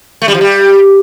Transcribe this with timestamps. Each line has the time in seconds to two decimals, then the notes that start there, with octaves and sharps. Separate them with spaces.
0.22 A3
0.28 G3
0.34 F3
0.41 G3